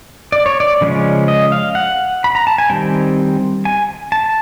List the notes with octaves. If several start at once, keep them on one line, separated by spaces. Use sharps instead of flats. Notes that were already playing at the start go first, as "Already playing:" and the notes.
D5
C#5
D5
C#3 F3 G#3 C#4
D#5
F5
F#5
B5
A#5
A5
G#5
D#3 G3 C4 G5
G#5
A5